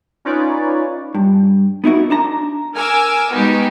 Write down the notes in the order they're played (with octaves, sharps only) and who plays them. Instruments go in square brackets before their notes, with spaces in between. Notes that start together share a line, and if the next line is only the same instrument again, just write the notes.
[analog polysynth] C#4 D#4 F4 B4 C#5 D5
[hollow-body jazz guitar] G2
B3 D#4 E4 F#4 A#4
D4 A5 A#5
[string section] A#4 G#5 D6 E6
G#3 B3 D#4 F#4 G4